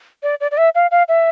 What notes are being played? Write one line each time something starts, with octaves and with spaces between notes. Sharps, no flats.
D5
D5
D5
E5
F5
F5
E5